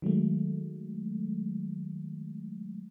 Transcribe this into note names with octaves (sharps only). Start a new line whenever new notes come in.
D#3 F#3 G#3 A3